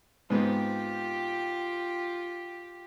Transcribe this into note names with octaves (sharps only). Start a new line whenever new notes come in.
G#2 B3 C4 F4 G4 G5